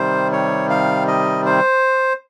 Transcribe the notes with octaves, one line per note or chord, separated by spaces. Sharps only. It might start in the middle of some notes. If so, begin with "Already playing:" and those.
Already playing: C3 D#3 G3 C5
C#5
F5
D#5
C5